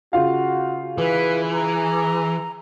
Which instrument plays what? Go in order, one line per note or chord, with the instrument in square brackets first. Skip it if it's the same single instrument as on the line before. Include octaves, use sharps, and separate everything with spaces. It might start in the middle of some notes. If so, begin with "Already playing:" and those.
[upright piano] C#3 F4 F5 [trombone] F#4
[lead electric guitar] E3 [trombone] G#4 [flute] B4
[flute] A#5